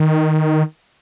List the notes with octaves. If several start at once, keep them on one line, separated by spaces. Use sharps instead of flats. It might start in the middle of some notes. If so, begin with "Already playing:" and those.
Already playing: D#3